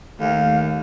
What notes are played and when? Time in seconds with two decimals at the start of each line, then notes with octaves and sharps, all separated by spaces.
0.20 D#2 D#3 A3 F5